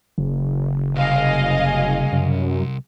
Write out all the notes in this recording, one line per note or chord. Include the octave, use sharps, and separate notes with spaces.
F#1 C#3
C2 G#4 D#5 F5
F#2